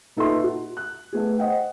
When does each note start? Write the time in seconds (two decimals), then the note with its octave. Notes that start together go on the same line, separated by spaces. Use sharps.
0.17 A#2 D#4 A4 B4 E5 C6
0.44 F#4
0.77 F#6
1.13 A3 B3 G#4
1.38 C5 D#5 F#5 G5